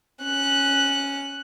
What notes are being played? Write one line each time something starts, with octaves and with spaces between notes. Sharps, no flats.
C#4 F#6